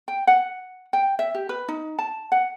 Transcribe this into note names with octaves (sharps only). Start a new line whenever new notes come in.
G5
F#5
G5
E5
G4
B4
D#4
A5
F#5